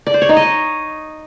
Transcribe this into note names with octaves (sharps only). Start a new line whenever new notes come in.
D5
C5
C#5
D#4
D#5